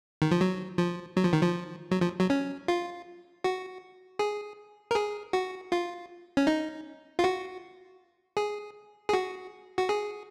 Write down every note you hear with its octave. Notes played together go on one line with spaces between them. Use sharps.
D#3
F3
F#3
F3
F#3
F3
D#3
F3
F#3
F3
F#3
C#4
F4
F#4
G#4
A#4
G#4
F#4
F4
C#4
D#4
F4
F#4
G#4
G#4
F#4
F#4
G#4